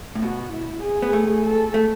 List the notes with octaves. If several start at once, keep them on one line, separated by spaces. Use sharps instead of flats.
A2
B2 F#4
E4
G#4
B3
A3
A4
A3